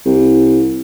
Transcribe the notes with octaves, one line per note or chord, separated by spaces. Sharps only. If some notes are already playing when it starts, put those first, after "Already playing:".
C2